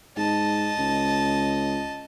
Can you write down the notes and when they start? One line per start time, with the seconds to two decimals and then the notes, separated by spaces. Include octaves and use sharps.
0.17 G#2 D#5 A5
0.78 C#2